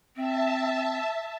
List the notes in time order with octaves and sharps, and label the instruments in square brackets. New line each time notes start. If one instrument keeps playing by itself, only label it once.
[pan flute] C4 [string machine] E5 A5